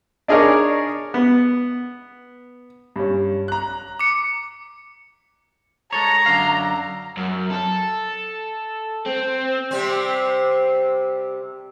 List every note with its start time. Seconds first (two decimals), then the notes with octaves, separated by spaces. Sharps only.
0.28 D4 D#4 G#4 A#4 C#5 D5
1.14 B3
2.96 G2 C#4
3.48 A#5 F#6
3.99 D6 C#7
5.93 G#3 A4 C#5 A#5
6.26 F#2 D3 F5
7.17 F#2
7.50 A4
9.06 C4
9.71 C3 G3 C4